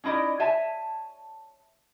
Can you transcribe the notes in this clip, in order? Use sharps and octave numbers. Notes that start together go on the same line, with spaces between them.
C#4 D#4 E4 D5 D#5
C#5 E5 G#5 A5